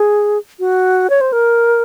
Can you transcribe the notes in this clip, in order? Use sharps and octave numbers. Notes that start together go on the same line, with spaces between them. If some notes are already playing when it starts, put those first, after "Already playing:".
Already playing: G#4
F#4
C#5
C5
A#4